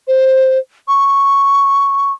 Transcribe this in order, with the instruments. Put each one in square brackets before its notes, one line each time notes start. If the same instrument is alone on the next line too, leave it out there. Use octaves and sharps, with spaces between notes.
[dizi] C5
C#6